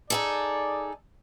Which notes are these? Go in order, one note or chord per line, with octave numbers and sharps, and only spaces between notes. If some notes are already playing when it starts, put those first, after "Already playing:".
D#4 G#4 A4 D5